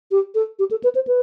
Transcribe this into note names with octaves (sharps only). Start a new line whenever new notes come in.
G4
A4
G4
A4
B4
C5
B4